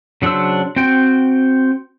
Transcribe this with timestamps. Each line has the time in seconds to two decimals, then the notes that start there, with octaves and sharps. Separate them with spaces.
0.22 C#3 F#3 D4 C5 E6
0.76 C4 F#4 G5